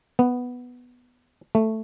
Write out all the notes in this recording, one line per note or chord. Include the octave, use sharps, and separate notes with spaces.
B3
A3